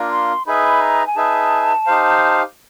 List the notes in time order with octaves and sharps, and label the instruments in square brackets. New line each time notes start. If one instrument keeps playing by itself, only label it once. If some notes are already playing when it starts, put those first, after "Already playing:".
Already playing: [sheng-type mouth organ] A#3 D4 F4 A#4
[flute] C6
[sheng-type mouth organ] D#4 G#4 B4 E5 [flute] B5
[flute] A#5
G#5
[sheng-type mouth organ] D#4 G#4 B4 E5 [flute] A5
[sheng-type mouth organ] D#4 G4 C5 F5